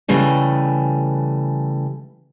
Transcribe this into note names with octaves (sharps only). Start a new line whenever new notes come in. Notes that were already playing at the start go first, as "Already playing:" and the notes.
C#3 E3 G3 A3 G#5